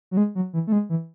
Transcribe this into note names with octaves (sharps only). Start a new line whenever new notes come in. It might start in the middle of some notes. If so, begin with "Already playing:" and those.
F#3
G#3
F#3
E3
A3
G#3
E3